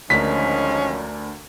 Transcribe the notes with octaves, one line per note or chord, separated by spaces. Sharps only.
D2 D#3 F3 G#3 C#4 D4 A#4 B6